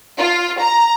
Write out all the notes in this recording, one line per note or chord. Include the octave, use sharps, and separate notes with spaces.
F4
A#5